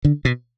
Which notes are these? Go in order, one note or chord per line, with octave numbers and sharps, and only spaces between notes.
D3
B2